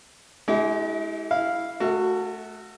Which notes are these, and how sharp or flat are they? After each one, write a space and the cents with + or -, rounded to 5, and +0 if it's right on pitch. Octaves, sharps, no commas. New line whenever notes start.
G#3 +30 E4 -25 G4 -30
E4 +0 F5 +0
A3 -25 F#4 +0 A4 +40